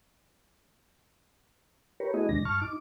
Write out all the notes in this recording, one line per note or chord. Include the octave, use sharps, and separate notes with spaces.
G4 A#4 B4 C#5
A3 B3 E4 F#4 G#4 D#5
D#2 C3 D#3 G#3 D4 A#6
G2 A5 C#6 F6
D#4 D6